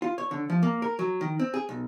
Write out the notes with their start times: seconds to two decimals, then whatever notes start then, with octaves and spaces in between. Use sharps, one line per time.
0.02 F4
0.18 C#5
0.31 D3
0.50 F3
0.63 A#3
0.82 A#4
0.99 F#3
1.21 D#3
1.40 C4
1.54 G#4
1.69 B1